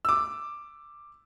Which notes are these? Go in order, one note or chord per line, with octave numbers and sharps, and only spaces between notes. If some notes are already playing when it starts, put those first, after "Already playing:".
D6 E6